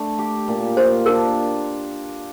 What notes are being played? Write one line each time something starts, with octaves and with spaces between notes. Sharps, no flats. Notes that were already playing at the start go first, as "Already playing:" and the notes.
Already playing: A3 D4
G4
A#2
F4 C5
D4 A#4